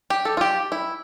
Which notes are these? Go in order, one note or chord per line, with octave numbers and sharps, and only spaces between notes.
G4
A4
F4
G4
E4